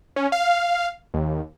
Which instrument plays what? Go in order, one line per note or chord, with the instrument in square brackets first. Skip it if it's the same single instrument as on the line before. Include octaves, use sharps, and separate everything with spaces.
[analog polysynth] C#4
F5
D#2